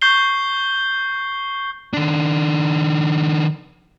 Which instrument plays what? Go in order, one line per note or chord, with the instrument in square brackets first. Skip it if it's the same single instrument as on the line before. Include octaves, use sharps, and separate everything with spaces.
[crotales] C#6 G6 C7 G7
[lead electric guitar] D#3 D4